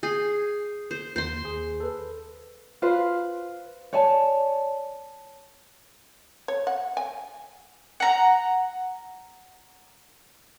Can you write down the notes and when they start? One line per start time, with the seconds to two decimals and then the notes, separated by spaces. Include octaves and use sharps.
0.03 G#4 G6 C7
0.91 C5
1.16 D#2 C5 C6
1.43 D#2 G#4
1.80 A4 B4
2.82 F4 B4 C5
3.93 C#5 D5 G#5 A5
6.48 C#5
6.67 F#5
6.97 G#5
8.00 F#5 A#5